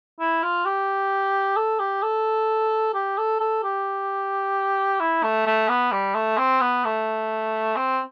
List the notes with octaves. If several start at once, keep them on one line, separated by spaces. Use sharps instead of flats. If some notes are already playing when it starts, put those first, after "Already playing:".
E4
F4
G4
A4
G4
A4
G4
A4
A4
G4
E4
A3
A3
B3
G3
A3
C4
B3
A3
C4